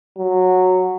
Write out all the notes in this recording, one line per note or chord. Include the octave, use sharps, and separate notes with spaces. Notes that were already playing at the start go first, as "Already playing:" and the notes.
F#3